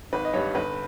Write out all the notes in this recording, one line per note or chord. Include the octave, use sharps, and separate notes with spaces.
G#1 B4
D#5
G2 G3 C#5
G1 B4